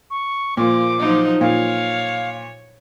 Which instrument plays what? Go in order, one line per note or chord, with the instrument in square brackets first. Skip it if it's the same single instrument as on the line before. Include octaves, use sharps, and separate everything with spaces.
[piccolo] C#6
[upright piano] A#2 [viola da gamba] F3 A#3 [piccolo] D6
[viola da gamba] F3 F#3 D#4
[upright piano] A#2 [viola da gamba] C#5 [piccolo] F5